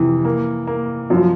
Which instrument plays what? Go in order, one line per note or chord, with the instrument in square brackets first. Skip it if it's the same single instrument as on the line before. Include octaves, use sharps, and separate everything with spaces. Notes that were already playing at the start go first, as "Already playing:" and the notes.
Already playing: [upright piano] F2 C3 [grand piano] E3
[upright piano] A#3
A#3
[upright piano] F#2 [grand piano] F3